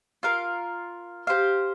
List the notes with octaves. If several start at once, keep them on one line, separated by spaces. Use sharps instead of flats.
F4 A#4 F5
G4 C5 F5